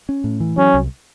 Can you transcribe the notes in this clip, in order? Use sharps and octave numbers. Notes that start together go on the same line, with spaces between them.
C#4
A2
E3
F#3 C#4
C2